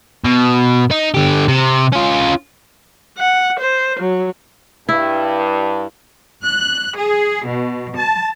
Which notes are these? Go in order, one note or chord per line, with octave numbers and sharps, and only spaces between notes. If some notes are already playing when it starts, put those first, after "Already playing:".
B2
D#4
D3 G4
C3
C#4 F4
F#5
C5
F#3
G2 E4
F#6
G#4
B2
A5